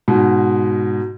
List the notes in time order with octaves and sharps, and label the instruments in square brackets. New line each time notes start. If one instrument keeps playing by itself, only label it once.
[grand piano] G#2 B2